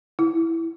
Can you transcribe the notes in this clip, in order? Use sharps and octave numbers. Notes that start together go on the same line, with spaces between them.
E4